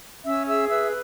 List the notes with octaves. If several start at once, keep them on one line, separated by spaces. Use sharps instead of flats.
C#4 E5 E6
G#4 E5 E6
B4 E5 E6